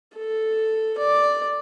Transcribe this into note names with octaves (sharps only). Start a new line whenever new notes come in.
A4
D5